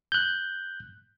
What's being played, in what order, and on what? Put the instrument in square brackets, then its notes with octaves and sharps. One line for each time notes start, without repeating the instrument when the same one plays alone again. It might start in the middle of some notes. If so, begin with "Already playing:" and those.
[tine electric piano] F#6 G6